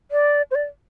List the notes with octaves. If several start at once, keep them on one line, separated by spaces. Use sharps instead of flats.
D5
C5
D5